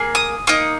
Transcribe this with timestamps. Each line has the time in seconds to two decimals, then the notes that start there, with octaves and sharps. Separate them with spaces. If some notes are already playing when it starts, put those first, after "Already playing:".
Already playing: A#3 G#4
0.15 D#6
0.47 A#3 D#4 D#6